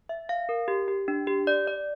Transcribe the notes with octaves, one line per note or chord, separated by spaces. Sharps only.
E5
F5
A#4
G4
G4
D4
G4
D5
D5